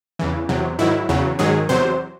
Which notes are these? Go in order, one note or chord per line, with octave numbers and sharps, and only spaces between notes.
E2 C#3 E3
E2 C3 F#3
G#2 D#3 F#3 E4
E2 C#3 F#3
G#2 D#3 F#3 G#4
E2 C3 F#3 C5